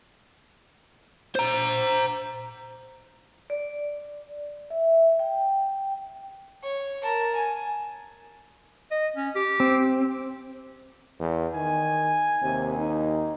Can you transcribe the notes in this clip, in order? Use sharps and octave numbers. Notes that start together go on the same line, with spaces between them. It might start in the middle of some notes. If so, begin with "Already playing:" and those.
C5 A#5
D5
E5
G5
C#5
A#4 A5
G#5
D#5
C#4
G4
C4
E2
D#3 G#5
D#2 C3
D#4